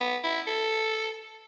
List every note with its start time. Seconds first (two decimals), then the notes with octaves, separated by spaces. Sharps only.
0.01 B3
0.24 E4
0.47 A4